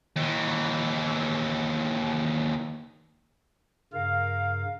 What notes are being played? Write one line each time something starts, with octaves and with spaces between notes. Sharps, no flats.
D#2 E3
G2 C#3 A#4 F5